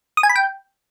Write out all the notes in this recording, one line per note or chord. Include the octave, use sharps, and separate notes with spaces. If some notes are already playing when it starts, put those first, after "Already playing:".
D#6
G#5
B5
G5